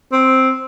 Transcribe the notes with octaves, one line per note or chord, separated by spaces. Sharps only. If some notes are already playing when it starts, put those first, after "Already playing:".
C4